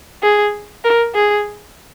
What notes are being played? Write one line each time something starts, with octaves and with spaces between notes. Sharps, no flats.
G#4
A#4
G#4